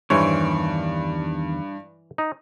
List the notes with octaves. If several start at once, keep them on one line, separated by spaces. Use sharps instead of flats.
E2 G2 D#3 E3 C5 C#5
D#4